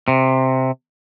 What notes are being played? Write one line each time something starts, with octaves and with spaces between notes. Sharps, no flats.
C3